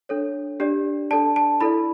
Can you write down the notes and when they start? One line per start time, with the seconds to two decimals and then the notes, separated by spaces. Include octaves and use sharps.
0.09 D4 A4 C#5
0.60 D4 G4 D5
1.11 D4 A4 D5 A5
1.36 A5
1.61 E4 A4 D5 B5